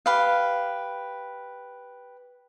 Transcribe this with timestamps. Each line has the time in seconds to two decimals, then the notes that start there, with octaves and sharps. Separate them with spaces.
0.06 G4 B4 F5